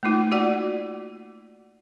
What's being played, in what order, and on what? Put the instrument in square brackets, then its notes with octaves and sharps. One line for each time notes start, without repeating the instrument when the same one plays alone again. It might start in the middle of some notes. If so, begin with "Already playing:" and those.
[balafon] A3 A#3 D#4 F4
F4 F#4 D5 F#5